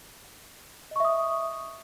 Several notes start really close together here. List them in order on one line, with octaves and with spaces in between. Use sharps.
D#5 C#6 E5 D#6